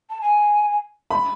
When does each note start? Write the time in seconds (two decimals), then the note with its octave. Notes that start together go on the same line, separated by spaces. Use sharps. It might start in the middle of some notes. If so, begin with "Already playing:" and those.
0.10 A5
0.21 G#5
1.11 B5